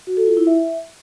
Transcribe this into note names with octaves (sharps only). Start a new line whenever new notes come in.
F#4
A4
F4
E4
E5